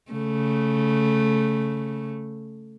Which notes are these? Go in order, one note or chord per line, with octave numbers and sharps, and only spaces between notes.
C#3 A3